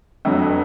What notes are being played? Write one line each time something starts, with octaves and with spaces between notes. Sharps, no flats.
F2 D3 F#3
B3